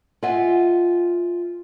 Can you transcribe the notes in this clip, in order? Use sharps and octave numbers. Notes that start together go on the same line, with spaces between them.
F4 D#5 E5 F#5 G#5